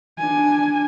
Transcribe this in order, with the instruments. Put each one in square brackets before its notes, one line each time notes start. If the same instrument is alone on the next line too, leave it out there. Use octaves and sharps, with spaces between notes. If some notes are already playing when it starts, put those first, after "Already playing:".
[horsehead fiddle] D4 G#5